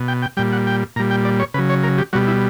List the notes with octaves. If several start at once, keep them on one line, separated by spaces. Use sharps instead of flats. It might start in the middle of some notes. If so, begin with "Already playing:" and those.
Already playing: B2
G5
G5
A#2 G3 G5
F#5
G5
A#2 G3 A#5
G5
D5
C#5
C#3 F#3 B4
C#5
A#4
G4
B2 G3 F#4
E4